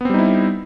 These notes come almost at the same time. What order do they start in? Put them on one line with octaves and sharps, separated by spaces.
B3 C4 G3 D#4 E4